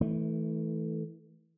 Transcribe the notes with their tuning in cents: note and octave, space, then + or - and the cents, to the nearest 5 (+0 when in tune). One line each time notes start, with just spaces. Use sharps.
E3 -25 A3 +0